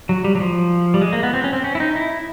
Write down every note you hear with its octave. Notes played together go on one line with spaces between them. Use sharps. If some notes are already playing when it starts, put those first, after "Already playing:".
F#3
G3
F#3
F3
G3
G#3
A#3
B3
C4
C#4
C4
C#4
E4
D#4
E4